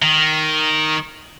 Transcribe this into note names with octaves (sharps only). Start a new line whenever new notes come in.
D#3